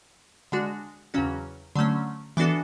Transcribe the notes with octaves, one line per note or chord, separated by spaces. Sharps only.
D3 G#3 D4 F#4
E2 C#3 F#3 C#4 F#4
D3 F#3 A3 C#4
E3 B3 D4 F#4 A4